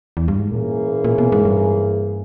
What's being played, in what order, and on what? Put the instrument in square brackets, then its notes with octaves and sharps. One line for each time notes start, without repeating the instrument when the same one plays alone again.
[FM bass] E2
G2
G#2
[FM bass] A#2 [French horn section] E3 A#3 C#4 G#4
[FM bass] A#2
B2
G#2
G2